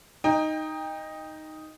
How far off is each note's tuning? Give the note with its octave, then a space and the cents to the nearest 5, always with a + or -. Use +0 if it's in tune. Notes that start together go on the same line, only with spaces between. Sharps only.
D#4 +0 G5 +25